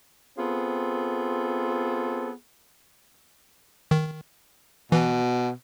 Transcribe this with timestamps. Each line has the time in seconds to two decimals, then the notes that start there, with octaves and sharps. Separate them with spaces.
0.38 B3 C4 F4 G#4 A4
3.91 D#3
4.92 B2 E3